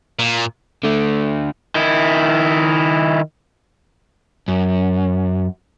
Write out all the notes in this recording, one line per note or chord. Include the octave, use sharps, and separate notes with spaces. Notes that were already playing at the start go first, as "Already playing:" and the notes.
A#2
D3 A3
D#3 E4
F#2